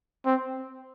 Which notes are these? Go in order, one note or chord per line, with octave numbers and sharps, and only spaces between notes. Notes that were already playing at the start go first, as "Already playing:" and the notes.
C4